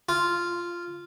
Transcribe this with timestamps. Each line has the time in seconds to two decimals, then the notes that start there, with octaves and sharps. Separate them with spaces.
0.09 F4